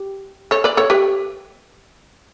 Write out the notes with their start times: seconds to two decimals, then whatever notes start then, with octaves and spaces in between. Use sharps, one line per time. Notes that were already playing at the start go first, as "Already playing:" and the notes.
Already playing: G4
0.51 A4 C#5
0.64 B4 D5
0.77 A4 C#5
0.90 G4 B4